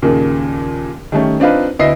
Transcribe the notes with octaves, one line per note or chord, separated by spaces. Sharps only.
D#2 A#2 C#3
D#3 G3 A3 C#4
C4 D4 D#4 F4 B4
D2 B3 E4 D#5 C7